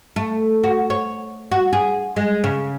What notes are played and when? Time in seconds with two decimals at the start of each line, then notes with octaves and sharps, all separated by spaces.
0.16 A3
0.64 F#4
0.90 C#5
1.51 F#4
1.73 G#4
2.16 G#3
2.44 C#3